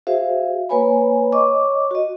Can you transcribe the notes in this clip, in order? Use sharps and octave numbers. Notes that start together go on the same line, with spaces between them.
F#4 G#4 C5 E5 F5
A#3 B4 C#5 G#5 B5
C#5 D#5 C#6 D6
F#4 D#5